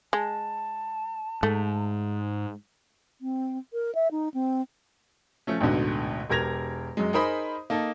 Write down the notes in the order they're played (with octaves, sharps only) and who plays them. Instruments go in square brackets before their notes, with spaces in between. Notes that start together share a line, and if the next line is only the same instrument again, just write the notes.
[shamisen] G#3 [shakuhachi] A5
[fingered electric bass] G#2 [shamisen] A3
[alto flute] C4
A#4
E5
D#4
C4
[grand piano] F3 A3 C#4
A1 D2 G#2 B2 D3
E1 G4 A#4 G#6 A#6 F7
F#2 G#3
D#4 G#4 A#4 C5 B5 D#6
A#3 D#4 A4